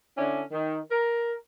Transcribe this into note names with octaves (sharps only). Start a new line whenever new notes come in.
D3 C#4 D4 E4
D#3
A#4